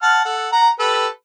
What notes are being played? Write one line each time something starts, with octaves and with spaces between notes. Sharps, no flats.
F#5 A5 F6
A4 F#5
F#5 A#5
G4 A4 B4